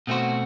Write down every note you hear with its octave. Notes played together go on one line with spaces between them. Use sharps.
B2 A3 C4 F#4 C5